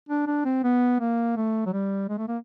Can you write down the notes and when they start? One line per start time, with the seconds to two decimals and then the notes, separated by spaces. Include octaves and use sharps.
0.09 D4
0.27 D4
0.45 C4
0.64 B3
1.00 A#3
1.36 A3
1.66 F#3
1.73 G3
2.09 G#3
2.18 A3
2.28 A#3